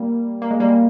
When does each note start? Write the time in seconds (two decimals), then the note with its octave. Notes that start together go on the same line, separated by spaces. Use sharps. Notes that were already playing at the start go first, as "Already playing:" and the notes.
Already playing: G3 A#3
0.42 A#3
0.51 G#3
0.60 G3 A#3